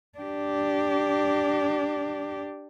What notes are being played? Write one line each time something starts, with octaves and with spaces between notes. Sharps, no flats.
D4 G4